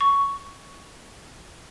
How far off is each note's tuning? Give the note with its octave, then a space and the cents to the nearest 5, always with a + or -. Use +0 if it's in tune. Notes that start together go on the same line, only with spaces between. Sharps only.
C#6 +10